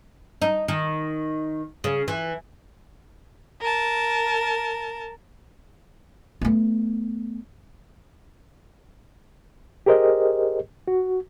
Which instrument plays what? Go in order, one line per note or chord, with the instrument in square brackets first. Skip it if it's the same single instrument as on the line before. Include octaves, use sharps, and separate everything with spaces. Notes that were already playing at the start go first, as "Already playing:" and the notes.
[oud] D#4
D#3
C#3
E3
[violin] A#4 A5
[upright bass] A3 B3
[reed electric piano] G4 G#4 A#4 C5 D#5
F#4